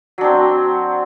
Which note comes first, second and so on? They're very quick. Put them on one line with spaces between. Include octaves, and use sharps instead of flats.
F#3 D4 C4